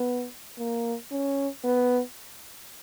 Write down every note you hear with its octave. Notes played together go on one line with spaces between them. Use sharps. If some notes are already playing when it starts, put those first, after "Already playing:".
Already playing: B3
A#3
C#4
B3